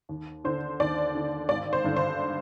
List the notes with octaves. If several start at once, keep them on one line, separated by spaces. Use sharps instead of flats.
D#2
D3 C5
D#2 D5
D3
G#1 D5
C5
G2 D3
C5